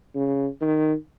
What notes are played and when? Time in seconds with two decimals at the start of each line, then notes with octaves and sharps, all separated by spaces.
0.15 C#3
0.61 D#3